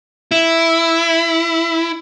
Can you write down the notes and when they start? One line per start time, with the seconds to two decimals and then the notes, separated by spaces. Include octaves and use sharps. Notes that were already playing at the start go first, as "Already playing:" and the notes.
0.31 E4